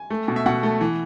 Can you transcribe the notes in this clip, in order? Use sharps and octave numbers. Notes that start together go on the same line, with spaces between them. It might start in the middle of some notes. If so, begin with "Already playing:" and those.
Already playing: G#5
A3
B2
E5
B2 F#5
A3
E3